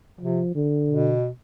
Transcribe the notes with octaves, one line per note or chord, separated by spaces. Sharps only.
C3 F3
D3
B2